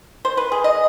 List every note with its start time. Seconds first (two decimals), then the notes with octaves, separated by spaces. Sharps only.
0.25 C5
0.37 B4
0.52 G#4
0.64 D#5